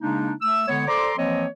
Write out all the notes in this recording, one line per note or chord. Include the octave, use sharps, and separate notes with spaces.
C#3 G#3 A#3 D4 D#4
A3 E6
D3 G#3 B3 C#5
A4 C5 D5 A#5 C6 D6
E3 F3 A#3 C4 C#5 D#5